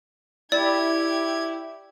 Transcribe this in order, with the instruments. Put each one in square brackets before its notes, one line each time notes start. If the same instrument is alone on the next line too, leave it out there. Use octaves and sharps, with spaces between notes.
[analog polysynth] E4 [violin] G4 G#6 [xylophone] D5